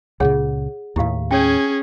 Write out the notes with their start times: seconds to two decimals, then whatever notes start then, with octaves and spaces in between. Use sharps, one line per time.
0.20 C#2 A#2 C#3 G#4 C#5 F#5
0.96 D#2 A2 E4 G4 F5
1.31 C#4 G#4 C#5 G5